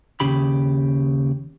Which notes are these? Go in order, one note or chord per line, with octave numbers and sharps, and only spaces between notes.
D#2 C#3 G4 B5